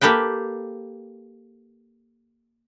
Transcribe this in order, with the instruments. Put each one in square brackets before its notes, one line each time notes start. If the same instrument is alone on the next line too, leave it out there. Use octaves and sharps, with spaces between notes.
[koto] A#3 G4 A4 B4 G5